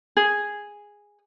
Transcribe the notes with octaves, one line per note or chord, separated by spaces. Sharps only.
G#4